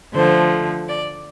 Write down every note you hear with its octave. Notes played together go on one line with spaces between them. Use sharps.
D3 F3 A3 C5
D5